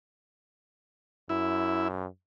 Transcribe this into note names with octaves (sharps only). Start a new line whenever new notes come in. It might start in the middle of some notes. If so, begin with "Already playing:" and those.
F#2 E4